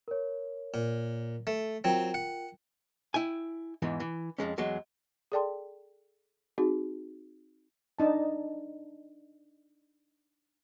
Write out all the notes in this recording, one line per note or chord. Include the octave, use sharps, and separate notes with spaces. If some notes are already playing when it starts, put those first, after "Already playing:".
A#4 C#5
A#2
A3
F#3 C4 F4 A#4 G5
F#5
E4 G5 G#5
E2 G#2 E3
E3
F2 G#2 G#3 C#4
E2 F#3 G#3
G#4 A4 D5 G5 A5 C6
C4 D#4 F#4 G#4
D4 D#4 A5